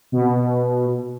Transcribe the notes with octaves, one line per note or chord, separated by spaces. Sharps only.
B2